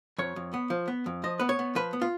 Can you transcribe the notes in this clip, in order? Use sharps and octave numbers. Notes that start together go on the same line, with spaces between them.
F2 C#5
F2
B3
F3
B3
F2
F3 D#5
B3 B4
C#5
B3
F3 B4
B3
F4